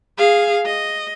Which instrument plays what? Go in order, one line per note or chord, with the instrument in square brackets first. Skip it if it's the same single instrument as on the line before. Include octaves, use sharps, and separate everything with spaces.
[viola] G#4 F5
D#5